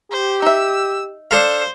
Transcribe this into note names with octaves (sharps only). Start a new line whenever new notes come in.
G4 C5
D#4 E5 E6
D4 A4 C5 F5